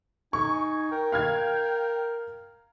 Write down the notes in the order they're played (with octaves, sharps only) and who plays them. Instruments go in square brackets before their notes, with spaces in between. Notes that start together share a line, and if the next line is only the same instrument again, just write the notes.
[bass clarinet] D#4 [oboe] G#5 [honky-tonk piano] C#6
[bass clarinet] A#4 [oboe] G5
[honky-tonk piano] F5 F6 G#6